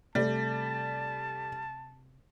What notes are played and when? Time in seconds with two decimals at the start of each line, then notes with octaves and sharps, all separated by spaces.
0.15 C3 G3 A3 A5